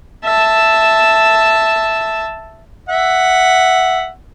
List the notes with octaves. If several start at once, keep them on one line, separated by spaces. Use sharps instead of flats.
E5 A5
E5 F#5